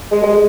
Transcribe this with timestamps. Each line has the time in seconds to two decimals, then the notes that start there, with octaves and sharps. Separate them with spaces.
0.12 G#3
0.23 G#3